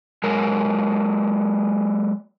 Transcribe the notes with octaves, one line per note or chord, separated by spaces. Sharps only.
F#3 G#3 A#4